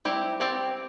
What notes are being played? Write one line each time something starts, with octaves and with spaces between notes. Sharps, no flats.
G3 C4 E4 G4
C4 G4 D5